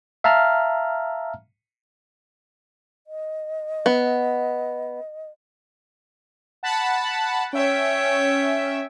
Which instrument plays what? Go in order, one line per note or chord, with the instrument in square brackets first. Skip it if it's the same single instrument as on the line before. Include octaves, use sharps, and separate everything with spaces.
[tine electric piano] E5 F5 A5 A#5 F6
[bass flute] D#5
[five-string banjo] B3
[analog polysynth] F#5 A5 B5
[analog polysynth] C#4 E5 [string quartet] C#5 G5